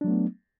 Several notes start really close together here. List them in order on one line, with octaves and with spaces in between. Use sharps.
D4 F#3 A3 B3